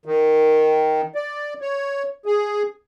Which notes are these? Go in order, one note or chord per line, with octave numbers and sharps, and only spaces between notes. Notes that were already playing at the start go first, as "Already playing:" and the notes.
D#3
D5
C#5
G#4